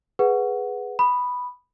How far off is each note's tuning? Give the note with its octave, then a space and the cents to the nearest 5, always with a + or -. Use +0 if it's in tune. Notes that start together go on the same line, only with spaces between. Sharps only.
G#4 +0 B4 +0 F#5 +0
B5 +0 D#6 -15